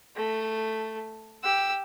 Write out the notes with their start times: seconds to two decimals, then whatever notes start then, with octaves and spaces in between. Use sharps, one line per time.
0.16 A3
1.44 G4 E6